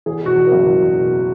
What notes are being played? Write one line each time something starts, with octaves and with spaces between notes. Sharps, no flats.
E2 G#4
B2 F#4
E2
A#4
F#1
E2
E2
B2